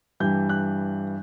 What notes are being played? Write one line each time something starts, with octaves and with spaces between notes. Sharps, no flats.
G2 E3 G3 G6
F#6